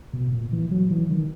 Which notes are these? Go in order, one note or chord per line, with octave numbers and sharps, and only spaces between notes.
B2
A#2
E3
F#3
E3
D#3